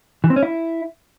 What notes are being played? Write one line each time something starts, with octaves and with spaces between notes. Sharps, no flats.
E3
C4
C#4
E4